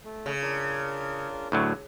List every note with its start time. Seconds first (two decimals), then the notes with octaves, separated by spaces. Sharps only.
0.05 A3
0.26 C#3
0.42 D4 F4 A#4
1.52 D2 A2 F#3